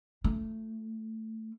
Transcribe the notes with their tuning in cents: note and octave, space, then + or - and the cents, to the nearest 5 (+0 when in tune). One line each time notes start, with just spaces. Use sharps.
A3 +10 F4 -25